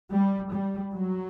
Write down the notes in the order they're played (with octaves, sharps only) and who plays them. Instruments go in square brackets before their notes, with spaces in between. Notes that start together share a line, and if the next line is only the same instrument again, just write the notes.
[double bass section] G3
G3
F#3